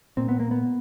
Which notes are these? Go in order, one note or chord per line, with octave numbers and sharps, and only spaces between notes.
A#2 C4
B3
A#3
B3